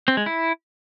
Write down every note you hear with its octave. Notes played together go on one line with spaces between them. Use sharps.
C4
G#3
E4